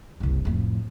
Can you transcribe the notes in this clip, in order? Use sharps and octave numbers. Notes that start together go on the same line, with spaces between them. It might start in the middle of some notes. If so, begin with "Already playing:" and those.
F#1 C2
F2 A2